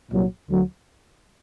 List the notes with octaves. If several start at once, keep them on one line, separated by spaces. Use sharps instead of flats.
C2 A#2 F#3
D2 D3 F#3